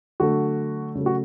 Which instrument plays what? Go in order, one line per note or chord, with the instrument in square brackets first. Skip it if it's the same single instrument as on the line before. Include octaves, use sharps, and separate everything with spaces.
[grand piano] D3 F#3 A3 F#4
C#3 F#3 A3
F#4